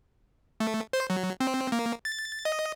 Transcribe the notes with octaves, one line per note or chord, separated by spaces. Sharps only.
A3
C5
F#3
C4
A#3
A6
D#5